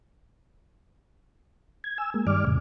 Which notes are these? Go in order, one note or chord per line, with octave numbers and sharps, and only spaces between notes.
G#6
G#5 E6
G#3 A#3
G2 D#3 G3 D5 D6 F6
F2 A2 C#3